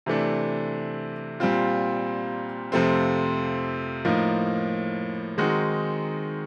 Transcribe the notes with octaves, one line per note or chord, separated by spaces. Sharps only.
C3 E3 A3 D4
A#2 G3 C4 F4
F2 C3 F3 A3 C4
A2 F3 A#3 D#4
D#3 G#3 C4 D#4 F#4